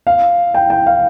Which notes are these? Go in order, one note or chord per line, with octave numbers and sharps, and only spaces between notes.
F5
G5
G5
F5